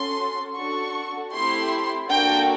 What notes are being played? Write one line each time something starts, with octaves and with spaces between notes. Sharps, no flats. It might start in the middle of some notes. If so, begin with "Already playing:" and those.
Already playing: C#4 F#4 A4 C6
D4 F#4 A4 C#6
A3 C4 E4 G4 C6
A#3 D4 F#4 A4 G5